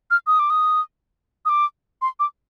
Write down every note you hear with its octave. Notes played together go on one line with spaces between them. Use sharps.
F6
D#6
D6
D#6
D#6
D6
C6
D6